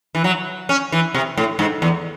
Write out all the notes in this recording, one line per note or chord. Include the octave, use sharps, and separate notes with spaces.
E3
F#3
C#4
E3
C3
A2
G#2
E2